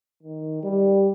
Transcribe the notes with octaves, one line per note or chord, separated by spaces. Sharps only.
D#3
G3